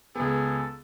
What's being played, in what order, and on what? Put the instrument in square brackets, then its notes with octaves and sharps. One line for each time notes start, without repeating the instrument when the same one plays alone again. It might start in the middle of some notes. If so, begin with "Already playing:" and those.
[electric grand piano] C#2 B3 [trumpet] G#4 [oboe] A4